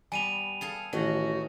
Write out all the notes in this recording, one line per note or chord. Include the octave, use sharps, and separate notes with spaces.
G3 B3 G#5 D#7 F7
G#4 A4 F5
A1 D#3 F#4